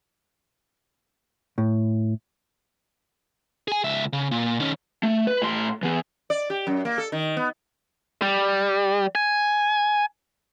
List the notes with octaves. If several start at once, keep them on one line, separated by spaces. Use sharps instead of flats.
A2
G#4 G#5
C#2 E5
C#3
A#2
D#3 C#4
A3
B4
A2 C6
E3 B3
D5
G4
F#2
A#3
A4
D#3
B3
G3
G#5